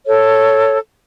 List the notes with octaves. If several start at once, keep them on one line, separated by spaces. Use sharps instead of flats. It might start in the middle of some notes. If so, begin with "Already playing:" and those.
A4 C#5